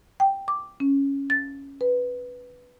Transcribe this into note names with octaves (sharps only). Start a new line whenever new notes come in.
G5
D6
C#4
A6
B4